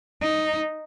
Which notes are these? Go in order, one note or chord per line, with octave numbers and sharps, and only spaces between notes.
D#4